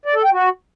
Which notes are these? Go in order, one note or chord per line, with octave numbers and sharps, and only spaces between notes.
D5
A4
G5
F#4